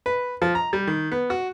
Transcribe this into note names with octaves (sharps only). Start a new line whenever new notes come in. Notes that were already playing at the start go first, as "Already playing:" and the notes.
B4
F3
A#5
G3
D#3
B3
F#4